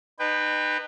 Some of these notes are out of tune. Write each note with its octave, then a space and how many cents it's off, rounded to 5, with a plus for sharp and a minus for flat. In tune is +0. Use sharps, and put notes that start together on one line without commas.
D#4 -30 B4 +5 G5 +20